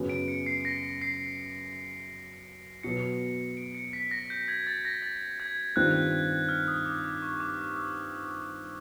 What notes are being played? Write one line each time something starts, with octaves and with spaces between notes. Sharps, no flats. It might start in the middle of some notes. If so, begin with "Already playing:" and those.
Already playing: F#2 C#3 F#3 B3
D7
C#7
C7
A#6
C7
B2 F#3 B3 C#7
D7
C#7
B6
A#6
G6
G#6
A6
A#6
A6
G#6
G2 D#3 G3 C4 F4 F#6
F6
D#6
D6
D6
C#6
D6
E6